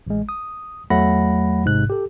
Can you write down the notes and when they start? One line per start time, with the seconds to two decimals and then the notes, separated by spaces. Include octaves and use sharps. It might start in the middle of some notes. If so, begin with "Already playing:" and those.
0.07 A1 G#3
0.29 D#6
0.90 E2 F#3 A3 F#5 B5 A#6
1.65 A1 G#2 C3 F#6
1.90 G4 A4